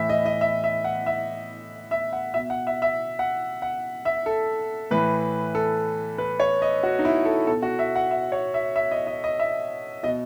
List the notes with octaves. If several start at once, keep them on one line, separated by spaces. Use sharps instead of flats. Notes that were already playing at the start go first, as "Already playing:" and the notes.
Already playing: A2 E3 E5
D#5
D#5
E5
E5
F#5
E5
E5
F#5
B2 E5
F#5
E5
E5
F#5
F#5
E5
A4
A2 E3 B4
A4
B4
C#5
D#5
F#4
D#4
E4
A4
B2 A4
F#4
E5
F#5
E5
C#5
E5
E5
D#5
D#5
D#5
E5
B2 D#5